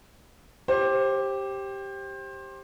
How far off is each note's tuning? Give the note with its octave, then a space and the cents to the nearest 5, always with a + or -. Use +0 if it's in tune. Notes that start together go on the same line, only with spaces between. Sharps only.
G4 +0 C5 +25